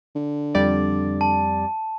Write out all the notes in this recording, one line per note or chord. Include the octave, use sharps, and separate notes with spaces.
D3
F2 G3 D5
A5